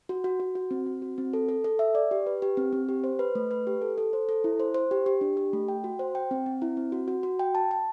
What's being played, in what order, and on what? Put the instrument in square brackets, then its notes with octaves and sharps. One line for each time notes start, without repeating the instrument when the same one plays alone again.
[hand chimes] F#4
F#4
F#4
F#4
C4
C4
F#4
C4
A4
A4
A4
E5
D5
G4
B4
G4
C4
C4
G4
C5
B4
A3
B4
G4
A4
A4
C5
A4
E4
C5
C5
G4
G4
D4
G4
A3
G5
F#4
C5
G5
C4
C4
E4
C4
F#4
F#4
F#4
G5
A5
A5